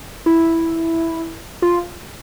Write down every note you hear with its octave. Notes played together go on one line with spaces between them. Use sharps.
E4
F4